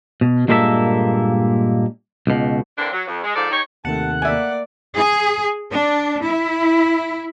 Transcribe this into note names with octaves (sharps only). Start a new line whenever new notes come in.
B2
G2 A#2 G#3 A#3 A4 E5
C#2 B2
D3 E3 A#3 C4 D4
F#3
F2
G#3
G#2 F3 A4 D5
D#4 G4 C#5
D#2 C3 D#3 A3 F#5 A5
A#3 D5 E5 G#5
G#4
D4
E4